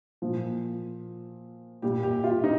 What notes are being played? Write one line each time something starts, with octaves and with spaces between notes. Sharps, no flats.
A#2 F3
A#2 G3 G4
G4
F4
D#4